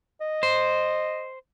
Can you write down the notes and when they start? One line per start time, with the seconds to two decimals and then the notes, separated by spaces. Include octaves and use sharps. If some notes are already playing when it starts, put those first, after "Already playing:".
0.21 D#5
0.43 C5